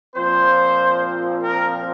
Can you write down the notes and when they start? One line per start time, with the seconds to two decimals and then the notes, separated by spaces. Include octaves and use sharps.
0.14 A#2 F3 C4 C5
1.42 A#4